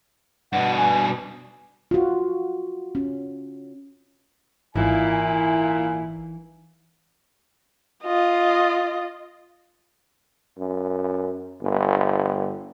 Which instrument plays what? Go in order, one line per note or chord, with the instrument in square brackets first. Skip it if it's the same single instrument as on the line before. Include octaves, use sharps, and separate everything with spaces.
[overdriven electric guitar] G2 B2 [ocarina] F#5
[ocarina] G#5
[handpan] F4 F#4
C#4
[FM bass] G#1 [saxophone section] A#2 E4 [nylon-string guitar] E3 D#4 [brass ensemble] G#5
[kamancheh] F4 D#5
[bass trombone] F#2
G1